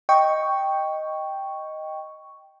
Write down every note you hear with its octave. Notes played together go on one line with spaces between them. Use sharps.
D#5 G5 C#6